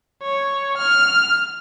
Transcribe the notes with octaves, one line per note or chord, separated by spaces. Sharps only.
C#5
F6